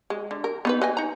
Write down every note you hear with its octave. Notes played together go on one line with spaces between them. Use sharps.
G#3
D3
A#4
B3 D#4 B4
B4 D#5 G#5
D#4 A#5